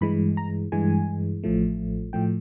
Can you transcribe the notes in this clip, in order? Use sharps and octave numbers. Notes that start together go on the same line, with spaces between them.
G2 E3 G#3 B5
A#5
G2 E3 G#3 G#5
A1 A2 F3 A3
A2 F3 A3 G5